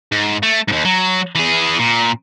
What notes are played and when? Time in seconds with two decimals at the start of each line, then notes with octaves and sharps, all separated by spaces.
0.12 G#2
0.43 A3
0.68 D#2 G#2
0.85 F#3
1.35 E3 G#4
1.79 A#2